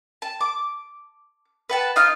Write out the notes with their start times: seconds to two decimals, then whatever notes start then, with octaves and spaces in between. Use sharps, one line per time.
0.22 A5
0.41 D6
1.69 B4 F#5 A5
1.96 D#4 F4 F6